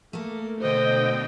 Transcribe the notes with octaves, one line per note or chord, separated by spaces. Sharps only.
A3 A#3 A4
B2 D3 C5 D#5 G5